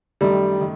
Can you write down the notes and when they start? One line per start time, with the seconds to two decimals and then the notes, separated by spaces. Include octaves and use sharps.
0.21 F#2 D#3 G3 A3
0.61 D#3